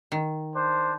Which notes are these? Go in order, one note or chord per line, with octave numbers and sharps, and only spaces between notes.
D#3
D4 C5